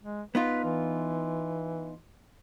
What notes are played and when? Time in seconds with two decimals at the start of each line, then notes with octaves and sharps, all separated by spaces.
0.03 G#3
0.35 B3 D#4 F4 B4
0.64 E3